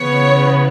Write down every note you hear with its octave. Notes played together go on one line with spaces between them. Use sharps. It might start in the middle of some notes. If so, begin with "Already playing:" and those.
Already playing: C#3 E3 B3 C#5